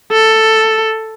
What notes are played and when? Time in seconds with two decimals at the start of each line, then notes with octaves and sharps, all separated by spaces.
0.12 A4